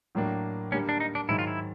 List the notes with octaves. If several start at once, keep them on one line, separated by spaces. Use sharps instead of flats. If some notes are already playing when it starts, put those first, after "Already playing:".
A2 F#3 A#3 D4
D3 G3 A#3 C#4
D4
D#4
D4
G#2 D#3 F#3 E4
F4
E4